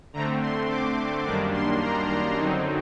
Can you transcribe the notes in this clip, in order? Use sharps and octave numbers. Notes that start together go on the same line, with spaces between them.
D3 A3 C4 A#5
C6
D6
F#2 D#3 G3 A#3 D4 D6
C6
A#5
A#5
F#2 D3 F#3 C4 D#4